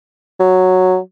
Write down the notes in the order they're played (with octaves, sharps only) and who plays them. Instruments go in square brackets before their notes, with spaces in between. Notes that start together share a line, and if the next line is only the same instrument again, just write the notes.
[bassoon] F#3